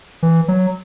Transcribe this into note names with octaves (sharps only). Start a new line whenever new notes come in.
E3
F#3